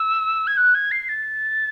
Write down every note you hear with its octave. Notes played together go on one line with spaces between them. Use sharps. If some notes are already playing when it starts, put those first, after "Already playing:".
Already playing: E6
G#6
F#6
G#6
C7
A6